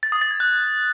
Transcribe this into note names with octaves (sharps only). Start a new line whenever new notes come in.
A6
D#6
A6
G#6
F#6